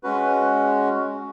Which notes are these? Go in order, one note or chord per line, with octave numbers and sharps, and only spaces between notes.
G#3 C#4 F#4 B4